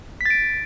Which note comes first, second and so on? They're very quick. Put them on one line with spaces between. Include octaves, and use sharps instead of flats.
B6 A6 D7